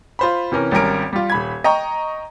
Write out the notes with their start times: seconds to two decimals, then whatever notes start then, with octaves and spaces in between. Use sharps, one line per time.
0.19 F4 C5 B5
0.52 C3 E3 C#4 A#4
0.71 G#1 G3 C#4 A#4 D7
1.13 G3 F4
1.30 D#1 B5 G#6
1.64 D#5 G5 A#5 C#6